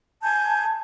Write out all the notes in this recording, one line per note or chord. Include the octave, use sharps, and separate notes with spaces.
G#5 A5 G6